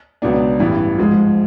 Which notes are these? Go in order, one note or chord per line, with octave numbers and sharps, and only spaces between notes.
C#2 B2 F#3 B3 D4
A1 G2 E3
G#2 F3 G#3